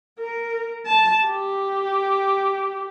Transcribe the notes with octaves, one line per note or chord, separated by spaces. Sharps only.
A#4
A5
G4